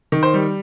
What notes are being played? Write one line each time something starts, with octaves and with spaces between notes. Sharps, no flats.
D#3
C5
G3